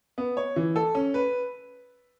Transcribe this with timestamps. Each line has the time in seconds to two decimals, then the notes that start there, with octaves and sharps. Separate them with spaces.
0.18 B3
0.37 C#5
0.56 E3
0.76 A4
0.95 C#4
1.14 B4